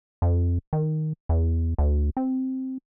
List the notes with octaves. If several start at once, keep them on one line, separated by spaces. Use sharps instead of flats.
F2
D#3
E2
D2
C4